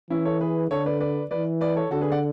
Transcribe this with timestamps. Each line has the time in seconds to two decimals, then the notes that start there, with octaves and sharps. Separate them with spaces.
0.10 E3 C#4 E4
0.25 A4 C#5
0.41 G#4 B4
0.70 D3 A4 C#5
0.86 B4 D5
1.00 B4 D5
1.31 E3 B4 D5
1.61 B4 D5
1.76 A4 C#5
1.91 D3 F#4 A4
2.01 G#4 B4
2.11 D5 F#5